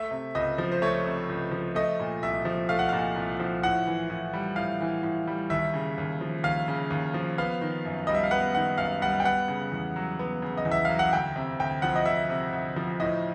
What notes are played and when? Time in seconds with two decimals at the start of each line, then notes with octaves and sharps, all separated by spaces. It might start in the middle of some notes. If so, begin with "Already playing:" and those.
Already playing: A3 E5
0.11 C3
0.35 C#2 D#5
0.58 F3
0.72 C5
0.82 A3 C#5
1.05 C3
1.29 C#2
1.51 F3
1.75 A3 D#5
1.99 A#2
2.22 C2 E5
2.45 F3
2.69 A3 F5
2.79 F#5
2.89 A#2 F5
3.16 C2
3.40 F3
3.63 A2 F#5
3.87 E3
4.10 A2
4.33 G3
4.56 A2 F5
4.81 E3
5.03 A2
5.27 G3
5.50 D#2 E5
5.74 C#3
5.98 D#2
6.21 F3
6.43 D#2 F5
6.68 C#3
6.90 D#2
7.14 F3
7.38 B3 F5
7.61 D#3
7.85 F#2
8.07 G3 D#5
8.15 E5
8.24 F5
8.31 B3 F#5
8.55 D#3 F#5
8.78 F#2 F5
9.02 G3 F#5
9.20 G5
9.25 B3 F#5
9.48 C#3
9.72 E2
9.96 F#3
10.19 B3
10.42 C#3
10.57 D#5
10.65 E2
10.72 E5
10.85 F#3 F5
10.99 F#5
11.13 D2 G5
11.36 C3
11.60 D2 G5
11.82 F3 F#5
11.96 D#5
12.06 D2 E5
12.30 C3
12.53 D2
12.76 F3
13.00 A2 D#5